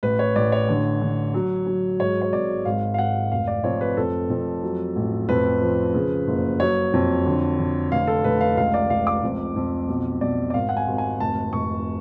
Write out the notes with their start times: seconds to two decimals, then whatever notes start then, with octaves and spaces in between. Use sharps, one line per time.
0.03 A1 B4
0.19 C#5
0.36 A1 D5
0.52 C#5
0.69 D3
1.01 D3
1.34 F#3
1.67 F#3
2.00 G#2 C#5
2.22 C#5
2.33 G#1 D5
2.65 G#1 F5
2.94 F5
2.98 G#1 F#5
3.32 F1 F5
3.47 D5
3.64 F2 C#5
3.81 B4
3.97 F2 A4
4.30 F2
4.63 F#3
4.96 A1
5.29 F2 B4
5.61 F3
5.95 C#3
6.27 F#1
6.60 F#3 C#5
6.93 F2
7.26 D3
7.59 D3
7.92 F1 F5
8.08 A4
8.24 F1 B4
8.41 F5
8.57 C#2 F5
8.74 D5
8.90 C#2 F5
9.07 D6
9.23 F2
9.56 F2
9.88 B1
10.21 B1 D5
10.50 D5
10.54 G#1 F5
10.69 F#5
10.77 G#5
10.87 G#1
10.98 G#5
11.20 F1 A5
11.53 F1 C#6